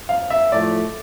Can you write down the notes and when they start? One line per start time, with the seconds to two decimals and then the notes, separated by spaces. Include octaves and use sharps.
0.09 F5
0.30 E5
0.52 A2 F3 A3 D5